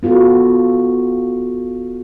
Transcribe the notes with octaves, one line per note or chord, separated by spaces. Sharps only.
B3 F4 F#4 A4